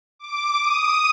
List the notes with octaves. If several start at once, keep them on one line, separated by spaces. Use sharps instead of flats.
D6
D#6